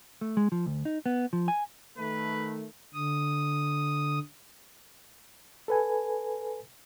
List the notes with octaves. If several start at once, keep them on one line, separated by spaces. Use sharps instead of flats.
A3
G#3
F3
D2
D#4
B3
F3
G#5
D#3 A3 B4
D3 D#6
A4 B4 G#5